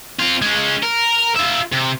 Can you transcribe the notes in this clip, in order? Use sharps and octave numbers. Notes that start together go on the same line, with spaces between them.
C4 F4
G#3 C#4
A#4
F4 E5
C3